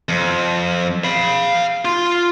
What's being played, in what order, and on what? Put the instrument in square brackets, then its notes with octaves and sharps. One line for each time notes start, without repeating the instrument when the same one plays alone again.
[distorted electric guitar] F2
F5 B5
F4